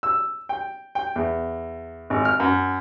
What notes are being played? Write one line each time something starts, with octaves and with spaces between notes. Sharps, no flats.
E6
G5
G5
E2
G#1
F6
F#2